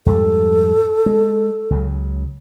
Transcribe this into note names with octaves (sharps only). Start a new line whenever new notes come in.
F2 G#2 G3 A4
G#3
C#2 C#3 F#3